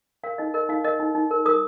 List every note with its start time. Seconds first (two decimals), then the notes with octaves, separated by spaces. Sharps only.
0.23 A#4 F5
0.38 D#4 D#5
0.54 A#4 D#5
0.69 D#4 F5
0.85 A#4 D#5
1.00 D#4
1.15 D#4
1.31 A#4
1.45 A#4 D#6